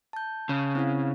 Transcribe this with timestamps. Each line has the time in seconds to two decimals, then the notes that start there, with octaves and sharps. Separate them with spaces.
0.13 A5 G6
0.49 C#3
0.75 C4 E4 F5